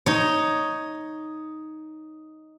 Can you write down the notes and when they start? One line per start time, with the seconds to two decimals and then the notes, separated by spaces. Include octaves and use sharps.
0.06 D#4 C#5